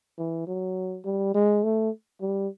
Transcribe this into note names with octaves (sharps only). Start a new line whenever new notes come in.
E3
F#3
G3
G#3
A3
G3